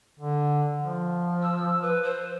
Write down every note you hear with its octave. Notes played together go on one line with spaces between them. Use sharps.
D3
F3
E6
B4
C5